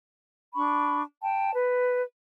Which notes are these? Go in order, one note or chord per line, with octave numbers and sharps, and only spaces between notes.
D4 B5 C#6
G5 A5
B4